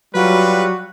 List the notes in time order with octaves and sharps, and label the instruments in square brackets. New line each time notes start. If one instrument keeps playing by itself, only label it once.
[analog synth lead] F#3 [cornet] G3 [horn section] F4 B4 [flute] F#4